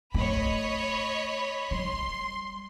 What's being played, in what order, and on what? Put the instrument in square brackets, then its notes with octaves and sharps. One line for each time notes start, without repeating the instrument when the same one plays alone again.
[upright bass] A3 [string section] C#5 D#5 B5
[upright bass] G3 [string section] C6